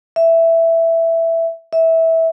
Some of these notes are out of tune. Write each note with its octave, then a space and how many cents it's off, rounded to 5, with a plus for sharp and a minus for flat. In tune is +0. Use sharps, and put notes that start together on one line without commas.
E5 +5
E5 -15